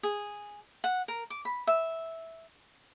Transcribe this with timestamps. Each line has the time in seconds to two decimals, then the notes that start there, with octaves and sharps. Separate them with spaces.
0.03 G#4
0.84 F#5
1.08 A#4
1.30 D6
1.45 B5
1.67 E5